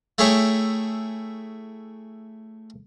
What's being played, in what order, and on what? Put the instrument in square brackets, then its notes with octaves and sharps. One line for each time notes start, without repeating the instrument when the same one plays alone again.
[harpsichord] A3 E4 G#4 C#5 E5 G5